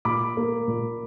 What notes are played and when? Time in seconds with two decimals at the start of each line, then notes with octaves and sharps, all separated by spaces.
0.05 A#2 B5 D6
0.37 A#3
0.68 A#2